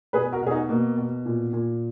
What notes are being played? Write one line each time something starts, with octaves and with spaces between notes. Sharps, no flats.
B2 G#4 B4
F#4 A#4
B2 G#4
D#4 F#4
B2 A#3
B2
A#2
A#2